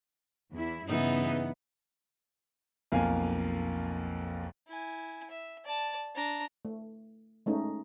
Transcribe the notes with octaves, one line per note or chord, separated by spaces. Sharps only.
E2 E4
G2 C#3 E3 B3 D#4
B1 F2 A#3 F5 G#5
E4 G#5
E5
D5 A5
D4 A#5
A3
G#3 A3 C#4 D#4